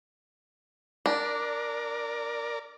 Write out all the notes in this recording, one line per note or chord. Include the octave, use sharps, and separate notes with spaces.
D4 A#4 D5